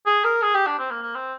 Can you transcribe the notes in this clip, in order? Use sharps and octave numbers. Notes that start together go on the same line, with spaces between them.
G#4
A#4
G#4
G4
D4
C4
A#3
A#3
C4